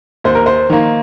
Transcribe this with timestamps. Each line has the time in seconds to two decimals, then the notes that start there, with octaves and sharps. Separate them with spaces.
0.24 D#2 C5
0.35 A#4
0.46 C5
0.70 D#3 A#3